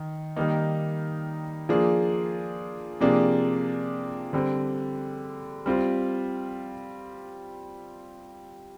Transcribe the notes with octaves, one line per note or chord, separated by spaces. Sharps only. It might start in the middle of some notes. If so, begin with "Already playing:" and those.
Already playing: D#3
D#3 G3 A#3 D#4
F3 A#3 D4 G#4
C3 F3 A#3 D4 G#4
D3 G3 C4
G3 C4 F4